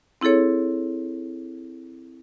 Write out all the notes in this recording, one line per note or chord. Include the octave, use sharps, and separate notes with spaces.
C4 E4 G#4 A4 C#5